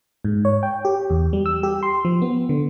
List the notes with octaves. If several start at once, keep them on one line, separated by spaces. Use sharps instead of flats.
G#2
C#5
G5
G4
E2
G3
E6
G4
C6
F3
B3
D3